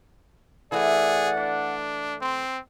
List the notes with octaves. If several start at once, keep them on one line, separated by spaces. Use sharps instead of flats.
E3 A3 G#4 D5 F#5
D4
C4 C6